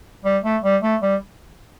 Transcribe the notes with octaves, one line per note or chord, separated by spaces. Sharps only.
G3
A3
G3
A3
G3